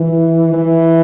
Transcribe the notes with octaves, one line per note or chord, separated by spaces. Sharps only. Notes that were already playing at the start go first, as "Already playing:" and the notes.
Already playing: E3
E3